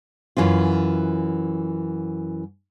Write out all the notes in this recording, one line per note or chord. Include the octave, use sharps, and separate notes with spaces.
F#2 E3 C#4 F4